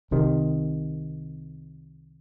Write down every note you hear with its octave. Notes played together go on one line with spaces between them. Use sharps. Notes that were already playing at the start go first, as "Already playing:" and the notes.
C2 C3 D#3